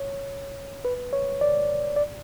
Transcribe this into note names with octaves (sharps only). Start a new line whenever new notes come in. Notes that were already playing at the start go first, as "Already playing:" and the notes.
Already playing: C#5
B4
C#5
D5
D5